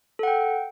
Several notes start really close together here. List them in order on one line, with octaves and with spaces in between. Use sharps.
A4 F#5 G5